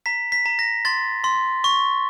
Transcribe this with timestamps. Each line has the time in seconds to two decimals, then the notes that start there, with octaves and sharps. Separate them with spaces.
0.06 A#5 B6
0.32 B6
0.46 A#5
0.59 A#6
0.85 C6 A6
1.24 C6
1.64 C#6